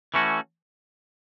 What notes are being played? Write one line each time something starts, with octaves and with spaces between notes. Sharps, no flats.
E3 A3 C#4 F#4